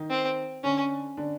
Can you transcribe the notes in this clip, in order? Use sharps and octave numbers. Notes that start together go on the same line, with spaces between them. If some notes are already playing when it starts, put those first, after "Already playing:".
Already playing: D#3 D#4
C4
D3 C#4 D4
D3 D4